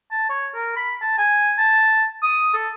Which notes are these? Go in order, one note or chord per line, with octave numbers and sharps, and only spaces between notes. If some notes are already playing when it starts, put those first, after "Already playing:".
A5
C#5
A#4
B5
A5
G#5
A5
D#6
A4